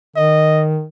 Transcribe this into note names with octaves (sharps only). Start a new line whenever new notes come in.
D#3 D#5